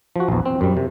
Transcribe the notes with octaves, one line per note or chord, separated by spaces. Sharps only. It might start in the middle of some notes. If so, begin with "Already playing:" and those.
F3 F#4
A#1 E2
C4
F#2 G3
C3